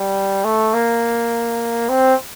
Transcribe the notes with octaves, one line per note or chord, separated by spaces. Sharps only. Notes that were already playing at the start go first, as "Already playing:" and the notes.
Already playing: G3
A3
A#3
C4